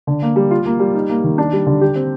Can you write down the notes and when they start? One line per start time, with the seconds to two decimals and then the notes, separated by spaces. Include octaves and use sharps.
0.07 D3
0.22 A#3
0.36 G3
0.51 F4
0.66 A#3
0.79 G3
0.94 D#4
1.09 A#3
1.24 D#3
1.38 D4
1.53 G3
1.67 D3
1.81 G4
1.96 C4